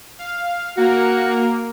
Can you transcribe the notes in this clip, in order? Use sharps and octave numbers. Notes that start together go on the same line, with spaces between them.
F5
A#3 F#4 A#4